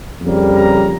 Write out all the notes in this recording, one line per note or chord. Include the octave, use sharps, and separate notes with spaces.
F2 C#3 G3 A#3
A#5